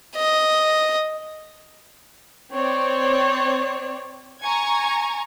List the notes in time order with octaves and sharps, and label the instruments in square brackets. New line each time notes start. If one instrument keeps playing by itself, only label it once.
[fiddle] D#5
[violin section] C4 C#5 D5
G#5 A#5 C#6 G#6